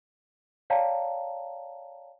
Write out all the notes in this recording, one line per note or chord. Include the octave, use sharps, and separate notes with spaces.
C#5 D5 F5 G5 A5 A#5